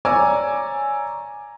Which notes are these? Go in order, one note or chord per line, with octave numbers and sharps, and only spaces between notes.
C#5 D5 G#5 A#5 D6 E6